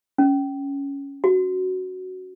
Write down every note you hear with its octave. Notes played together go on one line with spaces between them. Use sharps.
C#4
F#4